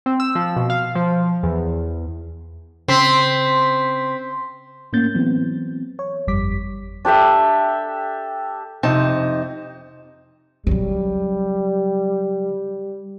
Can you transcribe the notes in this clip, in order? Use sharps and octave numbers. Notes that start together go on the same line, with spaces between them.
C4
E6
F3
B2
F5
F3
E2
C#3 C4 C6 B6
A2 A#3 C#4 G6 A6
E3 F#3 B3 C4
C#5
G1 F2 G3 D6 B6
D4 G4 A4 E5
F2 C3 D#4 A5
C#3 F#3 G3